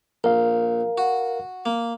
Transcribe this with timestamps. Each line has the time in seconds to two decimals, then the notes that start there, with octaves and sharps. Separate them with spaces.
0.24 A#1 A#4 F5
0.98 F#4
1.66 A#3